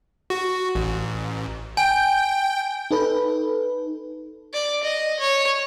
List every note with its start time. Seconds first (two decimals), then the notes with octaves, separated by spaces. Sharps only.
0.30 F#4
0.75 A1
1.77 G5 G#5 G6
2.91 D#4 A4 B4
4.54 D5
4.83 D#5
5.20 C#5